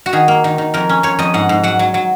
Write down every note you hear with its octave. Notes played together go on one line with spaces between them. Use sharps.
F#4
D#3 G#4
A#3
D#3
D#3
F2 A#4
C#4
F2 C#5
F2 D#5
G#2 F#5
G#2
F#3 F#5
F#3
F#3